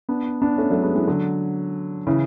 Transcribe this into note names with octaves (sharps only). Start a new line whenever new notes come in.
B3 D4
B3 D4
A3 C#4
F#3 A3
G#3 B3
E3 G#3
D3 F#3
C#3 E3